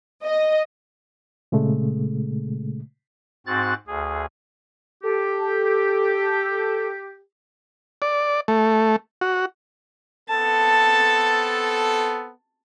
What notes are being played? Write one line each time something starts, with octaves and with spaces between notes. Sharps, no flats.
D#5
A#2 C#3 G#3 A3
G#2 C4 F#4 F#6 A6
D2 G#4
G4 A4
D5
A3
F#4
B3 C4 A4 A5